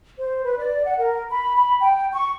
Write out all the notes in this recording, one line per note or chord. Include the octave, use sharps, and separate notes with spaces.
C5
B4
D5
F#5
A#4
B5
B5
G5
C#6